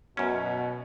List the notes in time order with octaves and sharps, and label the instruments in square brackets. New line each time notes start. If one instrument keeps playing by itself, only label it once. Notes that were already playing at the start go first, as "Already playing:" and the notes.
[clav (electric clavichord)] F#2 C#4 [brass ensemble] B2